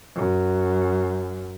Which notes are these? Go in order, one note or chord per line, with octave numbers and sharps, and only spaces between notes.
F#2